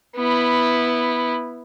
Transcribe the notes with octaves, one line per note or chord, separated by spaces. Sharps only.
B3 E4